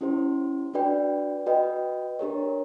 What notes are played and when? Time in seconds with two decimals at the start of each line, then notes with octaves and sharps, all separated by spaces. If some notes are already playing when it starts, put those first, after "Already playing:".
0.01 C#4 E4 G4 C5
0.74 D4 F#4 B4 D5 G5
1.46 F#4 B4 D#5 G5
2.19 D4 G4 A#4 C#5